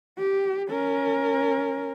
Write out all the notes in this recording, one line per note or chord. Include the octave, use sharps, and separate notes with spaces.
G4
C#4 A#4